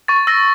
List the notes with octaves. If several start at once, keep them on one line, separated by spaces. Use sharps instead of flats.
C#6 A6
E6 A#6